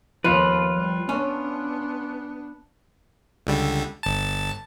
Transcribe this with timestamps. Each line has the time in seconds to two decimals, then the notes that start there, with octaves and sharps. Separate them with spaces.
0.24 D#2 F3 B3 F4 B4
0.75 G3
1.09 B3 C#4 D4
3.47 C#2 D3 G3
4.03 G1 A5